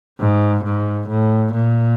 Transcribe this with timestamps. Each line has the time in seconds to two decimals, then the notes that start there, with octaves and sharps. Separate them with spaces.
0.20 G#2
0.65 G#2
1.09 A2
1.53 A#2